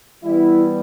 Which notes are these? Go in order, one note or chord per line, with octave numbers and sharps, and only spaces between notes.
E3 G3 B3 E4